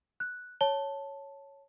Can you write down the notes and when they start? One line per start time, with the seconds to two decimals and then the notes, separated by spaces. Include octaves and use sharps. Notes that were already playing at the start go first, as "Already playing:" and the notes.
0.20 F#6
0.61 C#5 A5 G7